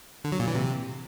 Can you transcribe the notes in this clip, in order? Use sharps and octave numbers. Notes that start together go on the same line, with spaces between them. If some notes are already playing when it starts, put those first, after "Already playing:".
D3
F#3
A#2
E3
C3